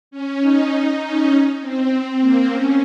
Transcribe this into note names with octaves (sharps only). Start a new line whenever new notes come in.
C#4
D#4
C#4
C4
A#3
C#4